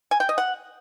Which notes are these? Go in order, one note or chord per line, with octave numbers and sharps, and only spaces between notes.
G#5
G5
D#5
F#5